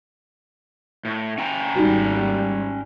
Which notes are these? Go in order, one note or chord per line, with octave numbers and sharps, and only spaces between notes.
A2
C#4 G5 A#5
G#1 G3 D#4 F#4